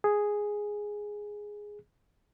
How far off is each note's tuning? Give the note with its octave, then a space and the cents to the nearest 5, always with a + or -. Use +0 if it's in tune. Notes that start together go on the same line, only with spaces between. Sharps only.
G#4 +0